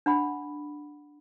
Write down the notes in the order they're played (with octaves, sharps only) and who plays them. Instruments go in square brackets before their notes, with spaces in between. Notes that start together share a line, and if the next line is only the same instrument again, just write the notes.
[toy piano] D4 F#5 B5